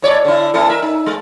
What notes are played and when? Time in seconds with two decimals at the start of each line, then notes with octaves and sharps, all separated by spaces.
0.02 A2 C#5 D5
0.25 D3 E4
0.54 A#3 E4 A4
0.69 A#4 E5
0.82 D#4
1.06 G#3